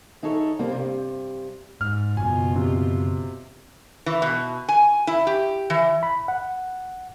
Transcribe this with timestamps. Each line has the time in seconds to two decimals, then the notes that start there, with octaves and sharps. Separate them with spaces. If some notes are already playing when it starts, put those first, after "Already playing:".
0.23 E3 D#4 G#4 A4 C#5
0.59 G3 A#3 C4
0.72 G2 C3
1.81 G#2 F6
2.17 F#1 B2 F4 G#5
2.55 C3
4.06 E3
4.22 B2
4.69 G#5
5.07 E4
5.27 G4
5.70 E3
6.03 B5
6.28 F#5